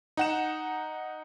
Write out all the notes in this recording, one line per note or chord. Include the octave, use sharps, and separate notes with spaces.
D#4 F#5 E7